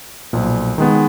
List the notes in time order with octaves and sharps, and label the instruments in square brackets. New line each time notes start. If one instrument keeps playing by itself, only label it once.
[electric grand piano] B1 A#2 F3
D#3 G#3 B3